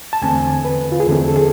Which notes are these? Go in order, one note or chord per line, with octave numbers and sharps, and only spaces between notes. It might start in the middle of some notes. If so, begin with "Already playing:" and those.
A5
E2 D3 A3 C4 G#5
B4
F4
G#4
E2 D3 A3 C4 A4
A4
G#4